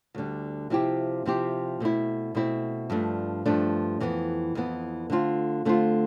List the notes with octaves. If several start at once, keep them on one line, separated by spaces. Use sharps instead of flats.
D2 D3 G3
C3 F3 C4 E4 G4
C3 F3 C4 E4 G4
B2 A3 C4 E4
B2 A3 C4 E4
G2 F3 A3 D4
G2 F3 A3 D4
F2 E3 B3
F2 E3 B3
D3 A3 C4 F4
D3 A3 C4 F4